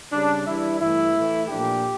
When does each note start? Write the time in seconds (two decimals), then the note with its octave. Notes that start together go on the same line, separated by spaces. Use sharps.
0.12 C#3 G3 C#4 D4
0.46 E3 G3 D4 E4
0.80 G2 E3 A3 E4
1.15 A2 E3 A3
1.49 A#2 F3 A3 D4 G4